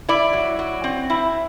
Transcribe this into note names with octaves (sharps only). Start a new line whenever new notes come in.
E4 D5
F#3
F#3
C4
E4